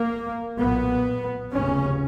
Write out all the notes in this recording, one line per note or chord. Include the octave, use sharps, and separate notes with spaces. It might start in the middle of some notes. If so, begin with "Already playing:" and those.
Already playing: A#3
B1 A#2 B3
F1 D#2 C#3 C#4